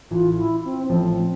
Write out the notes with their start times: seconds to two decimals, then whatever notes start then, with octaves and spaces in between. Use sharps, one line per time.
0.11 A1 A2 E3 F4
0.37 E4
0.64 C4
0.86 D4
0.90 A1 A2 F3 C4